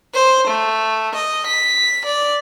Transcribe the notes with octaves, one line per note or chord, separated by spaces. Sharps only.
C5
A3
D#5
B6
D5